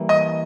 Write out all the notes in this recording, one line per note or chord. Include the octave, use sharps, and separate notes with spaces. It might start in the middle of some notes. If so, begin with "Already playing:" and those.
Already playing: E3 G3 A#3
D#5